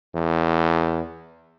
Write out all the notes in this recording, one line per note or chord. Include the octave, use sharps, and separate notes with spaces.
E2